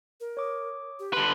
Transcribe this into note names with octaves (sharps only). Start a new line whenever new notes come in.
A#4
C#5 D6 D#6
G4
D3 B4 C6